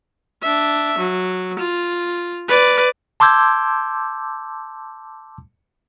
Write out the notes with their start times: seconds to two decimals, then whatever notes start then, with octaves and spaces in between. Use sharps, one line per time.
0.43 D4 E5
0.99 F#3
1.59 F4
2.48 B4 D5
3.20 A5 C6 D6 E6 G6 G#6